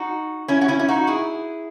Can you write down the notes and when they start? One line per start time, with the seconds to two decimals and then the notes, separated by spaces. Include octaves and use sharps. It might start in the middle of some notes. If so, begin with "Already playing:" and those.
Already playing: D#4 F#4
0.48 C#4 E4
0.61 F#4
0.68 C#4 E4
0.79 E4
0.88 D#4 F#4
1.07 E4 G#4